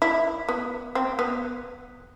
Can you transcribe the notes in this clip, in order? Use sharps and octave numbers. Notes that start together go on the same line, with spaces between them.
E4
B3
C4
B3